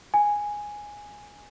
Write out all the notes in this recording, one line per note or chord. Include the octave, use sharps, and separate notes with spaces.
G#5